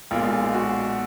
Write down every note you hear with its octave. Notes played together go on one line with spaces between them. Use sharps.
B1 A#2 G#3 F4
F4
F#4
F#4